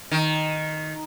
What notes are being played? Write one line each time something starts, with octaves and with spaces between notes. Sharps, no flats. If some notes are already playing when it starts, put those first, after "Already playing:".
D#3